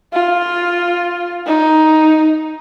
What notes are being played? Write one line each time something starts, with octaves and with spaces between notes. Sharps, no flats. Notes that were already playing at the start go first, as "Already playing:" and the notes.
F4
D#4